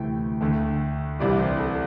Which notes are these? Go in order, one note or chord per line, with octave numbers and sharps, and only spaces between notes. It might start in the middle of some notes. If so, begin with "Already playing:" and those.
Already playing: D2 C3 E3 A3 G5
D2 D3 A3
C2 C3 E3 G3 D5
C5
A4